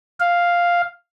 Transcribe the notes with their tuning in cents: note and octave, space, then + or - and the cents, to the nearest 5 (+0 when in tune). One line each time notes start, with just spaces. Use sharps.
F5 +0